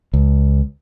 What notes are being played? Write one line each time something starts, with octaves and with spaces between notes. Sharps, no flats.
C#2